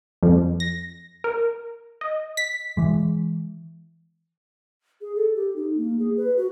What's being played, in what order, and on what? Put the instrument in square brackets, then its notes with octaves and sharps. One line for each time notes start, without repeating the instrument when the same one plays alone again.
[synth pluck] F2
A#6
A#4
D#5
B6
[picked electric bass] E3 G#3
[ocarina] G#4
A4
G4
D#4
A#3
G#4
B4
F#4